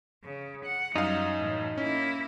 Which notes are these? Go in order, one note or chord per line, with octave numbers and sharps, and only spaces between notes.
C#3
F#5
F#2 G3 D#4 F5
A2 E3
A#3 C#4 E4